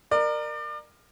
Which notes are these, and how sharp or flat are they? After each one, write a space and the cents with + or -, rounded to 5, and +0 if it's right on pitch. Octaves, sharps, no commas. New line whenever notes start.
A#4 +0 D5 +35